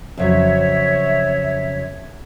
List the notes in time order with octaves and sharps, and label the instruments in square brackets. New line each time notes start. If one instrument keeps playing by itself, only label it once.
[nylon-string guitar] F2 C#3 F#3 [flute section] C#5 E5